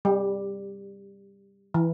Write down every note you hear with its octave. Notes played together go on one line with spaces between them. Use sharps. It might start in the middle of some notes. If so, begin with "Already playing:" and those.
G3
E3